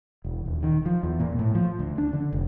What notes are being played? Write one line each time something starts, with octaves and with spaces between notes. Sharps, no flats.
E1
D#1
D#3
F3
E2
A#2
A2
F3
D2
D4
D3
F1